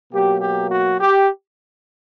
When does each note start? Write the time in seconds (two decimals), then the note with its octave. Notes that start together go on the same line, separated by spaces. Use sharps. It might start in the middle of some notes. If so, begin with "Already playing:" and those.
0.13 B2 F#3 A#3 G4
0.41 G4
0.69 F#4
0.99 G4